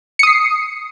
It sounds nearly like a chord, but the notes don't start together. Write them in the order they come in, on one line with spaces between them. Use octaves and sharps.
C#7 D#6 C7